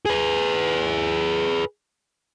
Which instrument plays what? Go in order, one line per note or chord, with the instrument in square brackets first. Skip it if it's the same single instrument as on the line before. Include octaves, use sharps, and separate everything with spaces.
[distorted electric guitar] G#4 B4